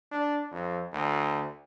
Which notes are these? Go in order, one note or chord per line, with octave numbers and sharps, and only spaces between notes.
D4
F2
D2